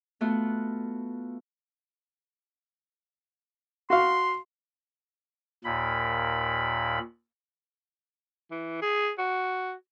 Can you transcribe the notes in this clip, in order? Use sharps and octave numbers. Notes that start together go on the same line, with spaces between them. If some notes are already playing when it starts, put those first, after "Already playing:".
A3 B3 F4 F#4
F#4 F5 C6
D#2 A#2 B5
E3
G#4
F#4